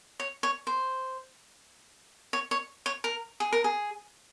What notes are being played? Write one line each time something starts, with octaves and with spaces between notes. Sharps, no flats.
C#5
C#5
C5
C#5
C#5
C#5
A#4
G#4
A#4
G#4